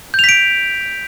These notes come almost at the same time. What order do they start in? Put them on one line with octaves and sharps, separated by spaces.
G6 F7 B6 D7